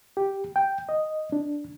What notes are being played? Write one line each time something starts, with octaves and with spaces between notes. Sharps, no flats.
G4
G5
D#5
D4